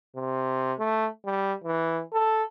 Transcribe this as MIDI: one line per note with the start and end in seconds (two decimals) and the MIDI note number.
0.16 0.73 48
0.79 1.08 57
1.26 1.54 55
1.64 2.03 52
2.13 2.43 69